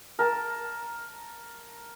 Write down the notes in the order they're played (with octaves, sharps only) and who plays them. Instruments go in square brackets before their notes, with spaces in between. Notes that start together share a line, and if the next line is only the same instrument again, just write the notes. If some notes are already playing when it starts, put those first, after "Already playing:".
[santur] A#4 A5